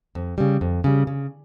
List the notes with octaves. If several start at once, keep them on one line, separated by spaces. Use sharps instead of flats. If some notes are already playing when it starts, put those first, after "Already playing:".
F2
C#3 G3
F2
C#3 G3
C#3